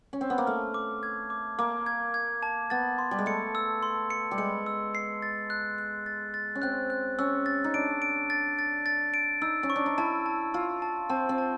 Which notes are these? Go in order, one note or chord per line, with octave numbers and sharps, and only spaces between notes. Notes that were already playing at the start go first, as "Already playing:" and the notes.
C#4
C4
B3
A#3
A3 F6
D6
G#6
D6
A#3 D6
G#6
G#6
A5
B3 A6
C6
G3
G#3
A3 C#7
E6
C6
C#7
G3
G#3 C#7
E6
C7
A6
F#6
F#6
A6
A6
C#4
C4 F#6
F#6
C#4 E6
A6
D#4
D4 D7
D7
A6
A6
A6
D7
D#4 E6
C#4
C#6
D4
D#4
E4 A5
A5
F4 E6
A5
C4 A5
C4
A5